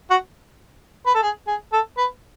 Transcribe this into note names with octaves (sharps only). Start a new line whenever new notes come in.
F#4
B4
A4
G#4
G#4
A4
B4